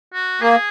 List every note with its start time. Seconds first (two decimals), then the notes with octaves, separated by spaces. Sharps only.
0.14 F#4
0.41 A#3 G#4